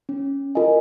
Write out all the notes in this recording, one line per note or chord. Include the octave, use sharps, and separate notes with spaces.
C#4
F4 A#4 D#5 G#5